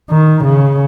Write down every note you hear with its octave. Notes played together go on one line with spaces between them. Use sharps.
D#3
C#3